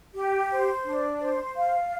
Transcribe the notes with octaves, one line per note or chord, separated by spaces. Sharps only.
G4
C5
D4
C5
F5